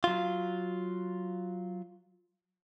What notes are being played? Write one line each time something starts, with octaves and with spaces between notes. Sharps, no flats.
F#3 F4